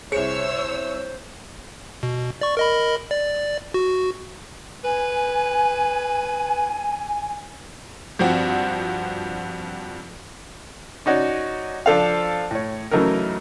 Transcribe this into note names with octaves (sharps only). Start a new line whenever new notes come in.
C2 G#4 C5 C#5 E6 C#7
B2
D5 C#6
A#4 D#5 B5
D5
F#4
B4 G#5
G2 F3 C4 F#4
C#4 D#4 F#4 C#5 D5
F3 D4 A4 C5 F5
A2 C#5
C#3 E3 F#3 A3 D#4 A#4